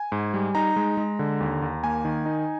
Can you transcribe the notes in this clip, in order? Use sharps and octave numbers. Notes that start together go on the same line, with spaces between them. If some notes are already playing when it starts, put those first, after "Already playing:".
Already playing: G#5
G#2
G3
D#4 A#5
G#3
G#3
D3
D#2
D#2
A#3 G#5
D#3
D#4